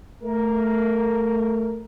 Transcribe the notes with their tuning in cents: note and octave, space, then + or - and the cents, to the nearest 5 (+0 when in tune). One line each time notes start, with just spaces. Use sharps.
A3 +0 A#4 +0